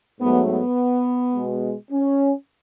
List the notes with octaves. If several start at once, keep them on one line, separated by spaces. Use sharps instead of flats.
G#2 F#3 A3 B3
B3
B2 G#3
C#4